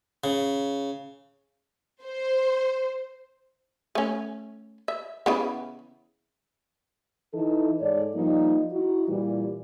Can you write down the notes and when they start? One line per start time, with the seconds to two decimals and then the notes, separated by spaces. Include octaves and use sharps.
0.24 C#3
2.03 C5
3.95 A3 C#4
4.88 E5
5.26 C#3 E3 B3
7.34 E3 D#4 A4
7.81 G#2 A4 C#5 D5
8.15 F3 G3 A#3 D#4
8.73 D#4 E4 F#4
9.08 A#2 E3 G3